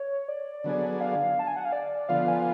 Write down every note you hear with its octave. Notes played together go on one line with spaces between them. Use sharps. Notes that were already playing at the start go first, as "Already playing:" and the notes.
Already playing: C#5
D5
D3 F#3 B3 D4 G#4
F5
A5
G#5
F#5
F5
D5
D3 F3 B3 F4 F5
G#5